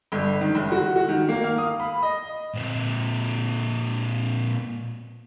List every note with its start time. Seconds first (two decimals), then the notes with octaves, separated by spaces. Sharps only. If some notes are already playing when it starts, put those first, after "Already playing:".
0.12 G1
0.41 D#3
0.55 F#1
0.72 F#4
0.96 F#4
1.08 D#3
1.28 A#3
1.43 F5
1.58 D#6
1.80 B5
2.02 D#5
2.54 A#2 C4